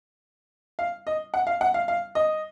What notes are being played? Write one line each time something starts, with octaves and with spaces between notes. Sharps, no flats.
F5
D#5
F#5
F5
F#5
F5
F5
D#5